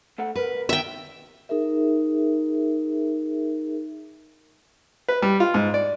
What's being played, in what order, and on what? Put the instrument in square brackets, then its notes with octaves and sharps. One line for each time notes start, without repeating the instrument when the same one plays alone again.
[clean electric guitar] A3 A4 F#5
[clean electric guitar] C2 A#4 [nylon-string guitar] B4
[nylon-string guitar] D#3 B3 [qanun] E5 G5
[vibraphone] D#4 G#4 A#4 E5
[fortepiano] B4
G3
F4
G#2
D5